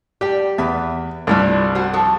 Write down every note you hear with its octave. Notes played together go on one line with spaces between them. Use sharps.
G3 G4 G5
E2 B4 E5
C2 G2 G3 E4 F4
F#4 C5
F3 F#4 A4